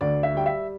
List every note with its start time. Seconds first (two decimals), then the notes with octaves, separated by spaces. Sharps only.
0.01 D2 D5
0.23 E5
0.34 G3 G5
0.46 E5